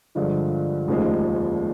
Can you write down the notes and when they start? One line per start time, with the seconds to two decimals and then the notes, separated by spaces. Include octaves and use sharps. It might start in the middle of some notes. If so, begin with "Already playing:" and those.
0.15 G2 D3 F3 G#3
0.87 F1 D#2 C#3 F3 G#3